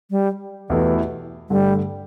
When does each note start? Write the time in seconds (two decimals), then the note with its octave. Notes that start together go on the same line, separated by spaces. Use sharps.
0.11 G3
0.69 E2 B2 E3 A3 E4 G4
1.50 G2 D3 G3 A3